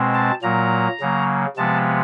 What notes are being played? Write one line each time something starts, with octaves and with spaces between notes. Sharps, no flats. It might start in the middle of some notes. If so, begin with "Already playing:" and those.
Already playing: B2 G#3 C4
A5
A#2 F#3 A#3 A#5
C#3 F#3 A#3
C3 F3 G#3 B3 A5